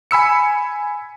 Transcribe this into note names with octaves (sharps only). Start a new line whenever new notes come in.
G#5 B5 E6 C#7